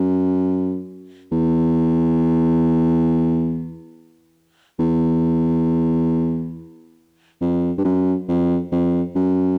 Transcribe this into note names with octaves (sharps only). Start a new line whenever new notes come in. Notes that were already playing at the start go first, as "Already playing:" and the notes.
Already playing: F#2
E2
E2
F2
G2
F#2
F2
F2
F#2